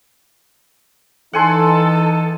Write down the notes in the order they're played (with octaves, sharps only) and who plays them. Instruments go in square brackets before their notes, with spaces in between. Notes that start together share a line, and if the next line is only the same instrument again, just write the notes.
[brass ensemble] E3 D#4 [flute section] A4 [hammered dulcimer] F#5 G#5 C6